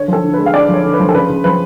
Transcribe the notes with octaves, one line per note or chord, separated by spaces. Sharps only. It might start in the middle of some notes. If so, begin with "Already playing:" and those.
Already playing: D3 C#5
F3 A4
D3
G#3 B4
F5
D3 D5
F3
C#5
D3
B4
F3
A4
C#3 B4
C#3
F3 B4